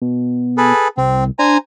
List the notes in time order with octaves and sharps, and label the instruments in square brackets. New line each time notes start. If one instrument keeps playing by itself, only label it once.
[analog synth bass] B2
[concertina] G#4 A4 B4
[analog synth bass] C2 [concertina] C4
[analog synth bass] D4 [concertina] C5 G#5 A#5